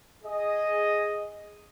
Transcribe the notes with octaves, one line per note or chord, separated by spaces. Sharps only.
G#4 D#5